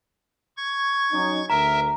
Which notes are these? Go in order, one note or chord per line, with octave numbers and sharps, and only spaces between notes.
C#6 G#6
F#3 C#4 D#4
D2 A#4 E5 A#5